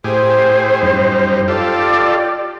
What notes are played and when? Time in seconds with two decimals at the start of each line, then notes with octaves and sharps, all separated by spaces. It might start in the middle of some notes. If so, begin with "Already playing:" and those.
0.04 A2 G4 G#4 C5
0.82 F#2 G3 D#4
1.48 F4 G4 A4 D5